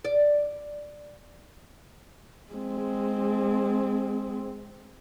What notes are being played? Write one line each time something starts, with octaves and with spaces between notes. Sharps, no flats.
D5
G#3 C4